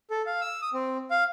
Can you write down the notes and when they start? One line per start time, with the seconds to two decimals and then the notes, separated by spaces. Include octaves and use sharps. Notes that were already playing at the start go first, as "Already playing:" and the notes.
0.11 A4
0.26 F5
0.41 E6
0.62 D#6
0.74 C4
1.11 F5